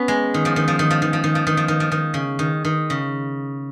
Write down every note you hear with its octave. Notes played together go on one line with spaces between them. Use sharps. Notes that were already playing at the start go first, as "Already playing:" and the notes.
Already playing: B3 C#4
G#3
D#3
F3
D#3
F3
D#3
F3
D#3
F3
D#3
F3
D#3
F3
D#3
F3
D#3
C#3
D#3
D#3
C#3